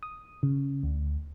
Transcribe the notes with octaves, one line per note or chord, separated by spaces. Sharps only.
D#6
C#3
D2